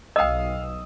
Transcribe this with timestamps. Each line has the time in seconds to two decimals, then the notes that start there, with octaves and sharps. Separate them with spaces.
0.16 B1 D#5 F5 G5 D#6 E6